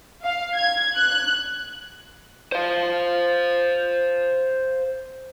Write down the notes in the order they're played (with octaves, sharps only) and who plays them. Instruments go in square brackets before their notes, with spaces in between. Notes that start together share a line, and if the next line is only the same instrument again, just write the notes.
[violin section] F5
G#6
F#6
[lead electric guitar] C5 F5